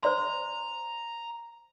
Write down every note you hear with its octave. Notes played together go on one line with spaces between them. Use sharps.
C5 D5 A#5 C6